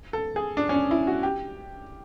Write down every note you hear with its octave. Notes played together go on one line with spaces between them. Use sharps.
A4
G#4
D4
C#4
D4
E4
F#4
G4